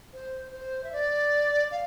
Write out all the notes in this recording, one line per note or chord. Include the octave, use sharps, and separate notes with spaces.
C5
C5
E5
D5
F5